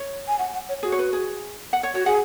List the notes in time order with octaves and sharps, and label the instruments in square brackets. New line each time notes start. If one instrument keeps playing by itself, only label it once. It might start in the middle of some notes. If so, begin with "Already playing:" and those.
Already playing: [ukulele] C#5
[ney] G#5
F#5
F#5
C#5
[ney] F#4 [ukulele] G#4
[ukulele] C#5
B4
G#4
F#5
C#5
[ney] F#4 [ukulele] C#5
[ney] G#4 [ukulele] F#5